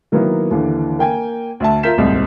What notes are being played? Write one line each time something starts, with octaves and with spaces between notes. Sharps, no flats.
D#3 F#3 A#3 B3 E4
D#2 D3 E3
A#3 G5 G#5
D2 E5 A5
F4 A#4 E5 G6 B6 E7
D#1 C2 G#2 D#5